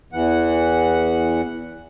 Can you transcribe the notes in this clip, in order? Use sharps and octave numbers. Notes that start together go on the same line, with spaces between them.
E2 E3 F#5